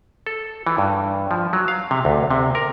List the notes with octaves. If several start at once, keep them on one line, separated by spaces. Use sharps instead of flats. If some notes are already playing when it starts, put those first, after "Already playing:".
A4
E3
G2
F3
F#3
F5
C3
D2
C3
A#4